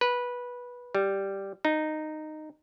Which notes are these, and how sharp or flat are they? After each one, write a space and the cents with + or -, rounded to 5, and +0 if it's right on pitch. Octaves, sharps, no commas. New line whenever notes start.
B4 -15
G3 +0
D#4 -10